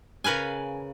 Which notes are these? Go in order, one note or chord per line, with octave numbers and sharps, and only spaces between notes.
C#3 A#4 B4 F5 G#5